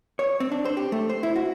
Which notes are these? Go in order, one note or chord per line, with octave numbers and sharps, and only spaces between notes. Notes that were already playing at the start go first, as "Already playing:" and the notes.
C#5
C4
D4
C5
G4
A3
C5
E4
F#4